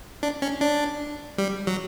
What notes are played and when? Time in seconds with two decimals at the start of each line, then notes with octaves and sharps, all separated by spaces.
0.23 D4
0.42 C#4
0.61 D4
1.38 G3
1.67 F#3